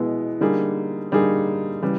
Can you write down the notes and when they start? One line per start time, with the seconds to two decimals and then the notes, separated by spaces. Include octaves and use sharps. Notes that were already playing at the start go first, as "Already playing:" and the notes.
Already playing: B2 G#3 B3 E4
0.40 D3 G3 A#3 D#4 G#4
1.12 D3 G3 A#3 D#4 G#4
1.82 C#3 E3 G3